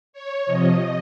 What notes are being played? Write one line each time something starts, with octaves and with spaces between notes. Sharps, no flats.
C#5
C3 F3 D#5